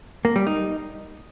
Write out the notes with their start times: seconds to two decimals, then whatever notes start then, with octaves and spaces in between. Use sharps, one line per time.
0.25 A#3
0.36 G3
0.47 D#4